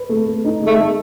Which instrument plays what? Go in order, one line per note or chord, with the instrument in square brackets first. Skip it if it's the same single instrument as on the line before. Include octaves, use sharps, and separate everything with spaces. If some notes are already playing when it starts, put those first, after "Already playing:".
Already playing: [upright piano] B4
A3
A3
D#4
G#3
[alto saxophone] A3
[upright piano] G#3